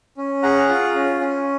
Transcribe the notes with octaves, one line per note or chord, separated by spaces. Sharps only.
C#4
G#4 F#5 A#5
F4
C#4
C#4